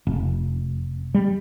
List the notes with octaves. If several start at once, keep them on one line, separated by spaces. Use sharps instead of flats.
F1
G3